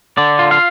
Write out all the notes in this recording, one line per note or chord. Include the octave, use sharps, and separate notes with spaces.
D3 D5
F4
F5